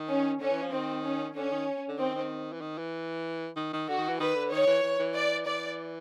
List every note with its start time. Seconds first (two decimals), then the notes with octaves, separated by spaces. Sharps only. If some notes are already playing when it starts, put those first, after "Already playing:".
Already playing: D#3
0.08 C#4
0.40 D3 C#4
0.52 E3
0.62 F3
0.72 D#3 C4
1.04 C#4
1.35 D3 C#4
1.52 D#3
1.89 D3
1.99 D#3 C4
2.15 D#3
2.53 E3
2.61 D#3
2.78 E3
3.56 D#3
3.73 D#3
3.88 D3 F#4
3.98 D#3
4.09 E3
4.20 D#3 B4
4.35 D3
4.52 D#3 C#5
4.67 E3
4.83 E3
4.99 E3
5.14 D5
5.46 E3 D5